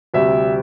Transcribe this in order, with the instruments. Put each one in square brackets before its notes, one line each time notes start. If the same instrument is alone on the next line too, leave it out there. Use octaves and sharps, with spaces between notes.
[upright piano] D2 C3 G3 E5